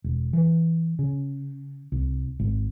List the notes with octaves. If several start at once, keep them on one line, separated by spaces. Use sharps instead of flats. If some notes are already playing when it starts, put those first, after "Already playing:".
E1
E3
C#3
C2
G#1